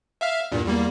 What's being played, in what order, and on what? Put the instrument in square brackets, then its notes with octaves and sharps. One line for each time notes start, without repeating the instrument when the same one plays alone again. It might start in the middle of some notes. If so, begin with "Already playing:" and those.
[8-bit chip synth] E5 F5 F6
E2 G2 A#2
E2 G3 A#3